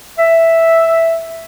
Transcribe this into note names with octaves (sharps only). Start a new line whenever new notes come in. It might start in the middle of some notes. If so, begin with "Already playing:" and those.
E5